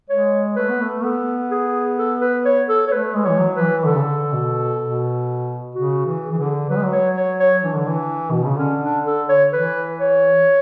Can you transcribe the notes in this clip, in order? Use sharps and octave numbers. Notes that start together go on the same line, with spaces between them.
G#3 C#5
A3 B4
B3
A3
B3 A4
G#4
A4
B4
C#5
A4
C#5
A3 B4
G#3
E3 C#5
F#3
B4
E3
D3 A4
C#3
D3
B2
B2
C#3 F#4
E3
G#4
E3
D3
F#3 B4
G#3
F#3
C#5
C#5
C#5
E3 D4
D3
E3
B2
C#3
D3 C#4
D4
A4
C#5
E3 B4
C#5